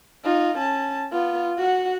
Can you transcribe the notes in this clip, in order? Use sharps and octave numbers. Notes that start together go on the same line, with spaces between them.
D#4 F4
C#4 A5
B3 F4
F#4 F#5